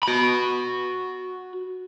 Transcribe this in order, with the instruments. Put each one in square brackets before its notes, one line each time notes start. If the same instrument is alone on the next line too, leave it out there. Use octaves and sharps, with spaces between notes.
[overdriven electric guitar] F#4 B5